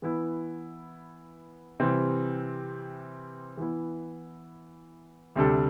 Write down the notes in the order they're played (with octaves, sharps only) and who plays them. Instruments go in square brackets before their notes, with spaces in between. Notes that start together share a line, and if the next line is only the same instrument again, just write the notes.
[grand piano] E3 B3 E4
C3 E3 G3 C4
E3 B3 E4
D2 C3 G3 D4 A4